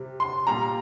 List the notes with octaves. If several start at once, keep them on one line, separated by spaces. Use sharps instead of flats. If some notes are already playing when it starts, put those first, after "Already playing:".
Already playing: C3 G3
C6
A#2 G3 A#5